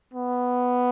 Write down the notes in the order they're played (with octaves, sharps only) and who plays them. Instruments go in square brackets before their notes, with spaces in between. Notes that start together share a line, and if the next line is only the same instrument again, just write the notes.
[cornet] B3